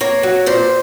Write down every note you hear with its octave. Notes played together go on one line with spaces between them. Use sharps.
A#3 C#5
F#3
A#2 C5